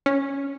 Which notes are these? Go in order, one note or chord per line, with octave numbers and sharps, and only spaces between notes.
C#4